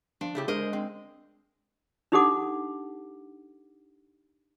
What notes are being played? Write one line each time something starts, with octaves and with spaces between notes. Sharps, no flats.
F3 D4
C#3 A3 E4 G4
G#3 D4 G#4 A#4 C5 D#5
C4
D4 D#4 G4 A4 F#5 D6